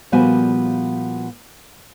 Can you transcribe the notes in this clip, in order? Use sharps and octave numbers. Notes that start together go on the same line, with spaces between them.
A#2 F3 G3 B3 F#4 G#5